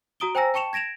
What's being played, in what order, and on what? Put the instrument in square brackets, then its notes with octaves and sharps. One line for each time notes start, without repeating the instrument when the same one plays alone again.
[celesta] F#4 A#5 D#6 D7 G7
C5 G5 G#5 A#5 E6 A#6
G5 A5 C#6 C#7 E7 F7
G#6 A#6 D7 E7 F7